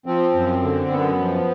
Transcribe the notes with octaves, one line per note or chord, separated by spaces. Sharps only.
F3 C4
F#2
D3
F#2 B3
F3